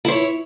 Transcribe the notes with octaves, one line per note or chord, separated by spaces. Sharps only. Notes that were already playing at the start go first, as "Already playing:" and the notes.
E4 C5 C#5